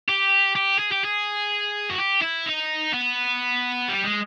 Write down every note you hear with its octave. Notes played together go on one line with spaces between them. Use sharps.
G4
G4
G#4
G4
G#4
F#4
G4
E4
D#4
B3
G3
G#3